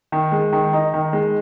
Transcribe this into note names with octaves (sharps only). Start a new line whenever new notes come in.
D#3
G#3
D#3
D#4
D#3
G#3